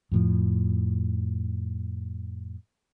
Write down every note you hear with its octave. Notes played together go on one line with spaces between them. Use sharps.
F2 A2 F3